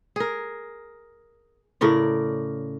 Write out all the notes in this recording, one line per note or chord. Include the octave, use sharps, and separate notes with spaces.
G#4 A#4
A2 C#3 A#4 D5